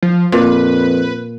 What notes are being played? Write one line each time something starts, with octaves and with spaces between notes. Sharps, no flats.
F3
F2 A#2 B4